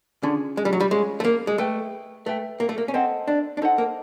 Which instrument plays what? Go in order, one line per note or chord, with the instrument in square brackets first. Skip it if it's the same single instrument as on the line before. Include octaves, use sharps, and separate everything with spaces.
[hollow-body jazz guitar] D3 [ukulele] C#4 F4 G#4 C#5
[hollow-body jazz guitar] G#3
G3
F#3
G3
[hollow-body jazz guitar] G#3 [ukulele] C#4 F4 G#4 C#5
[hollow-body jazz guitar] A3
A#3
G#3
[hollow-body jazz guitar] A3 [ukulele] B4 E5 G5
[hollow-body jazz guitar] A3 [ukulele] B4 E5 G5
[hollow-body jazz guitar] A#3
A3
A#3
C#4
[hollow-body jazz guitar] C4 [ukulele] A4 C5 D#5 F#5
[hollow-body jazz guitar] D4
D4
[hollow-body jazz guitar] D#4 [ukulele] A4 C5 D#5 F#5
[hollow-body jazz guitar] A#3